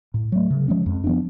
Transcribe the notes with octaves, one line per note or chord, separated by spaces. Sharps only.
A2
F#3 A3
C#3
F3 G#3 C#4
F2
F3 B3 D4